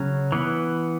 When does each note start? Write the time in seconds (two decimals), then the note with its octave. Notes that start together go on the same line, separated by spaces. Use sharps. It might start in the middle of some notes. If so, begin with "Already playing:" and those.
Already playing: C#3 F#3 C#4
0.32 E3 B3